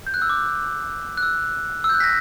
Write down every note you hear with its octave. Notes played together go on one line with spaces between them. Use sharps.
G6
F#6
E6
D6
F#6
E6
E6
G6
F#6
B6
A#6